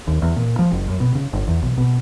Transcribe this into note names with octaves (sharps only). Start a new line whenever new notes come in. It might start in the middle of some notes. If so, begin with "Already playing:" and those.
D#2
E2
A#2
F3
F#1
F#2
B2
C#3
G1
E2
B1
B2